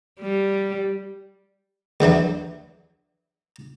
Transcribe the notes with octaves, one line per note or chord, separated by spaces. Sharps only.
G3
C#2 D3 E3 F#3